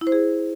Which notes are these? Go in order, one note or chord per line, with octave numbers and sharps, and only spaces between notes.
E4
C5
G#4